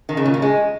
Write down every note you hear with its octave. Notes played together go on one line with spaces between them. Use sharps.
D#3
C#3
A#2
C#3
G#3